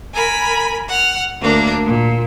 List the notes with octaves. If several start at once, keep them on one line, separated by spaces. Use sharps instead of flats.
A#4 G#5 B5
F#5 F6
D2 A#3 D4
A#2